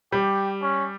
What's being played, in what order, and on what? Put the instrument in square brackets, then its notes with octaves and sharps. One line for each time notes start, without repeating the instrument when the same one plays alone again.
[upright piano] G3 [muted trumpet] G4
[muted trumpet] C#4